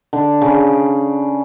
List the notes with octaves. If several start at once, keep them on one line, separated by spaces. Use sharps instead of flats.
D3
C#3